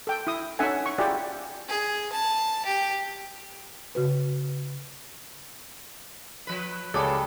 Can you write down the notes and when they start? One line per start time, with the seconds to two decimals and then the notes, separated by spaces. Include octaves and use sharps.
0.07 A4 G5
0.27 E4 D#6
0.59 C#4 D#4 A4 E5 F#5 G#5
0.86 C#6
0.98 E4 F4 G4 G#4 D5
1.69 G#4
2.12 A5
2.65 G4
3.95 C#3 F#4 B4
6.47 F3 B4
6.94 C#2 G3 G#4 A4 C#5 D6